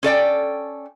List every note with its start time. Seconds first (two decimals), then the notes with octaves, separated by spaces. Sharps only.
0.03 C#4 A4 D5 G5